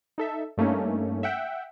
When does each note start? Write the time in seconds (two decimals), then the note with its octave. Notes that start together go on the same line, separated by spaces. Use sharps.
0.18 D#4 A4 E5
0.58 G2 A3 A#3 C#4 D#4
1.23 E5 F#5 G5